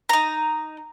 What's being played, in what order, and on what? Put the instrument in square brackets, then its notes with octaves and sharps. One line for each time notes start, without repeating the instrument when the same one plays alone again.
[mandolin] D#4 A#5